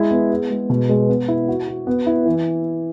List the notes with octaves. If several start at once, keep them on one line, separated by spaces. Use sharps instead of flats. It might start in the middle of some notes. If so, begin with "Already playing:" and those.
Already playing: G#3 E4
B3
G#4
G#3
B2
G#3
B3
E4
F#4
F#4
B3
E4
E3